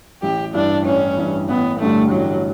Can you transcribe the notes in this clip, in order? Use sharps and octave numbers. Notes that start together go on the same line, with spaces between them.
A1 G4
G2 E3 D4
A1 C#4
G2 E3
A1 B3
G2 D3 G3 A3
A1 F#3